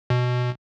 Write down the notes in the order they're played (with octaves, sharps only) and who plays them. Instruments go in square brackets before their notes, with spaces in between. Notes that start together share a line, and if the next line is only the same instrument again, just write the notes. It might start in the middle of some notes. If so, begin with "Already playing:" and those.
[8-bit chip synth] B2